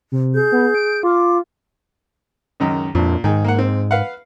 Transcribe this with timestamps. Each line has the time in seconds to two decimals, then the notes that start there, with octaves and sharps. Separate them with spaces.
0.12 C3
0.34 G#4 G6
0.52 B3
0.74 D7
1.03 F4 D6
2.60 C#2 F#2 D#3
2.95 F2 A#2 D4
3.24 G#2 D#3 D#4 G#4
3.44 A#3 A#4 F#5
3.59 C4
3.91 B4 F5 F#5